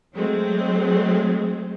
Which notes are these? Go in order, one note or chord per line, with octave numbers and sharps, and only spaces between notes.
F#3 G#3 A3 C4